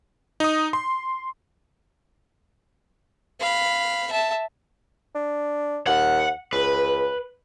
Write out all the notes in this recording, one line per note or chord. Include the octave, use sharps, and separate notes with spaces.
D#4 D#6
C6
F5 B5
E5 A5
D4
D#2 F#5
C#2 B4